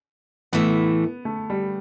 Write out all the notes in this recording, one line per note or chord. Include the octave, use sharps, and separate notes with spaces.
A2 E3 A3 B3
A3
G3